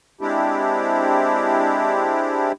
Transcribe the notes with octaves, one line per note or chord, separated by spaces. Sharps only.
G#3 C4 D4 E4 G4